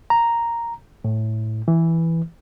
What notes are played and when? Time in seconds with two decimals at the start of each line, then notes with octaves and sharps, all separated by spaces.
0.10 A#5
1.05 A2
1.68 E3